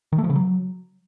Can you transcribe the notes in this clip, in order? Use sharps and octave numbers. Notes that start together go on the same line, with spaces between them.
D#3
A3
F3
C#3
F#3